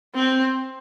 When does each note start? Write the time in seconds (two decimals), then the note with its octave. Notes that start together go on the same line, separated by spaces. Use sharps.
0.14 C4